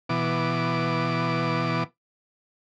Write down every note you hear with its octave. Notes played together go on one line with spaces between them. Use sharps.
B2 E3 D6